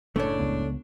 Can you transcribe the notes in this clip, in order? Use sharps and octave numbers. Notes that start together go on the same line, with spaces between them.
F#1 A2 C#3 A3 D4 C#5
C#2 B3